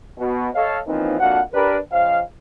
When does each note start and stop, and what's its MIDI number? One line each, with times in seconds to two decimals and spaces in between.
0.18 0.48 47
0.55 0.79 69
0.55 0.79 73
0.55 0.79 75
0.55 0.79 77
0.87 1.19 52
0.87 1.19 53
0.87 1.19 58
0.87 1.19 60
0.87 1.19 61
0.87 1.19 63
1.20 1.41 41
1.20 1.41 58
1.20 1.41 62
1.20 1.41 66
1.20 1.41 77
1.20 1.41 78
1.54 1.77 62
1.54 1.77 67
1.54 1.77 70
1.54 1.77 71
1.92 2.20 49
1.92 2.20 53
1.92 2.20 72
1.92 2.20 75
1.92 2.20 77